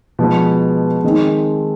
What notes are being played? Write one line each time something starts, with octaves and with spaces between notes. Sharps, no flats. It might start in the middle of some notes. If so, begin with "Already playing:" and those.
B2 F3 G#3 B3
D#3 G#3 C4